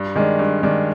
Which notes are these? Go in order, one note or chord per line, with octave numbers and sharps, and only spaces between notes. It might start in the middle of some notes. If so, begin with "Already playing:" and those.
Already playing: G2
D#3 G#3 D4
G2
D#3 G#3 D4